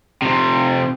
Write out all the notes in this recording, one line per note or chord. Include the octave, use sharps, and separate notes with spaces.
C3 F3